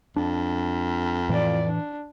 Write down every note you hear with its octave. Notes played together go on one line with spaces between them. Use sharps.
F2 D4
A2 E3 F4 D5
D4